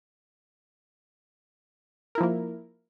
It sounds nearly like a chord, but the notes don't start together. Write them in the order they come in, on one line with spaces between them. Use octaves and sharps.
A#4 E4 F3 A#3